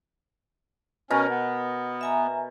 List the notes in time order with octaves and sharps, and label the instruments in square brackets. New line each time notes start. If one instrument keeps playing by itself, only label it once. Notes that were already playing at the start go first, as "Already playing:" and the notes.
[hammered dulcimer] B2 A#4 [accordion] C#4
[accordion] B3
[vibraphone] E5 G#5 A#5